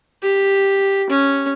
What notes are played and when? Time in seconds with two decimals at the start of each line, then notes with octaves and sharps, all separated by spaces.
0.22 G4
1.10 C#4